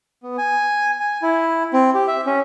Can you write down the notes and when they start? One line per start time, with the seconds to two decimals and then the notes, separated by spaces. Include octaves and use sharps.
0.23 B3
0.38 G#5
1.00 G#5
1.22 E4
1.73 C4
1.94 G4
2.07 E5
2.26 C#4